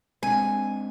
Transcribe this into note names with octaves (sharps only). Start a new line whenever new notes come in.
G#3 C4 D4 G#5